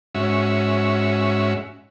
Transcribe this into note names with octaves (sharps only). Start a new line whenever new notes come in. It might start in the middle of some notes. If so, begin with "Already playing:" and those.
G#2 C#4 F#4 E5